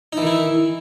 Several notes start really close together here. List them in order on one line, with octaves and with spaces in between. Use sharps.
D#4 E3 D#3 E4